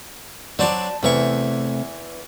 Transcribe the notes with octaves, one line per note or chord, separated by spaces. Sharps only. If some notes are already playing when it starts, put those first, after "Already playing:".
F#3 C4 D4 D5 A5
E2 C3 E3 A3 C#6